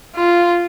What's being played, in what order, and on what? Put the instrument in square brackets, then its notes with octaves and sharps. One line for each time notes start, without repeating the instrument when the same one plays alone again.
[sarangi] F4